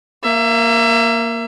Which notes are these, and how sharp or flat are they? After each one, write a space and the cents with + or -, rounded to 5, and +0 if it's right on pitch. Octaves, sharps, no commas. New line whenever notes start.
A#3 +0 E5 +30